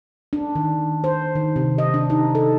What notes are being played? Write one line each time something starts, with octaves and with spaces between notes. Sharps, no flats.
D4
D#3
C5
D#3
C3
D#5
D4
D#4
A4